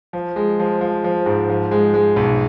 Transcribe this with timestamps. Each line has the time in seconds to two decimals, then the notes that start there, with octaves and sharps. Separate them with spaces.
0.13 F3
0.36 G#3
0.60 F3
0.81 F3
1.04 F3
1.26 G#2
1.50 F3
1.71 G#3
1.94 G#3
2.16 B1